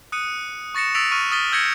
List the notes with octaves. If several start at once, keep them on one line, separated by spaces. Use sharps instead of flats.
D#6 F#6 C#7 D#7
C#6 A6 A#6 C#7 E7
D#6 E6 A6 B6 D7 F7
C#6 F6 D#7
D#6 F6 A6 B6 D#7 G7
E6 G6 G#6 A#6 C#7